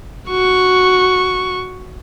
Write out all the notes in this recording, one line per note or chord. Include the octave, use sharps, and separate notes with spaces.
F#4 C#6